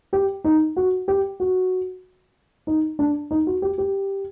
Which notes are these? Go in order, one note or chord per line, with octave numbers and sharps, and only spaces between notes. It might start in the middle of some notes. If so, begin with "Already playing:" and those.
G4
D#4
F#4
G4
F#4
D#4
D4
D#4
F#4
G4
G4